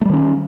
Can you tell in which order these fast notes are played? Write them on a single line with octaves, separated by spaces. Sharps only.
A3 G3 D#3 C#4